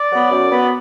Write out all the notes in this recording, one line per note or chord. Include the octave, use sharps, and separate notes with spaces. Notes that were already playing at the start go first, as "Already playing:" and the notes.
Already playing: D5
F#3 B3
F#2
F#3 B3